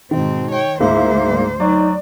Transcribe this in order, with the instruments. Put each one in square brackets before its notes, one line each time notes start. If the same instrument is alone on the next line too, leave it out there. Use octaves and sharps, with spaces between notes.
[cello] G#2 C4 [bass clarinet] B2 [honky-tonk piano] D#3
[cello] C#5 G5
[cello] D2 C5 [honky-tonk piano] G#2 A#3 [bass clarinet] E4 [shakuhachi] E5
[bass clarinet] G3
[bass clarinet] F#3 [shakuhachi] D#4 [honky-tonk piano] D5